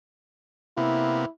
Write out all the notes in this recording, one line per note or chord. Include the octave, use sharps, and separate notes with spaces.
C3 A#3 B3 E4